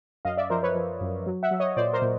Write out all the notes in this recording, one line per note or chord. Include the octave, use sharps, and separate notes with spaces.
F#2 D#5 F5
D5 E5
F3 A#4 C5
B4 C#5
F3
F#2
F#3
E5 F#5
F#3
C#5 D#5
A#2 C5 D5
A#4 C5
A#2